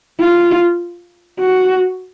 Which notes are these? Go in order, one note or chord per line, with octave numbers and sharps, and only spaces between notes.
F4
F#4